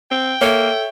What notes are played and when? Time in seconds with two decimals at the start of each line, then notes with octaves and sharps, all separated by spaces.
0.11 C4 G5
0.41 A#3 A4 C#5 E5